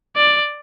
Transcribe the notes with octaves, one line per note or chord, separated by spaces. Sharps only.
D5